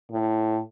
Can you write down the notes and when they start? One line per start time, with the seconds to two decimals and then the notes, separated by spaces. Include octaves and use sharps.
0.12 A2